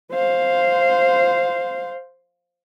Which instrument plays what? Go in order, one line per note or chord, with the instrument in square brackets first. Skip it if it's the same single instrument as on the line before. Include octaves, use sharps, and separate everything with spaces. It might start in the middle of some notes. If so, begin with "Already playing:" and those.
[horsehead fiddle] C5 F5